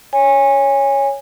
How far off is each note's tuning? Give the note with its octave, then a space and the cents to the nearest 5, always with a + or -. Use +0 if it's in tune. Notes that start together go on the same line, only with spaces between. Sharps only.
C#5 +0 G#5 -20